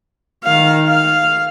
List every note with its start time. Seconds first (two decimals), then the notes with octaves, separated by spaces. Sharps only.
0.44 D#3 F5
0.87 F5